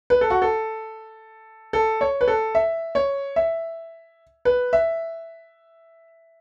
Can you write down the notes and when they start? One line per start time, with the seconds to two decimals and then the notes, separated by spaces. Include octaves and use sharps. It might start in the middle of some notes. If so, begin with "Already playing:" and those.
0.10 B4
0.21 A4
0.30 F#4
0.42 A4
1.73 A4
2.01 C#5
2.21 B4
2.28 A4
2.55 E5
2.95 C#5
3.36 E5
4.45 B4
4.73 E5